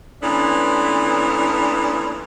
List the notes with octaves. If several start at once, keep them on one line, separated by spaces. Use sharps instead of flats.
A#2 E3 A3 B3 C#4 D4